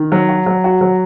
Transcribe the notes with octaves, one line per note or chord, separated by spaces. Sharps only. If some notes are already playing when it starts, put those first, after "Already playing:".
Already playing: D#3
F#3
F#4
F#3
F#4
F#3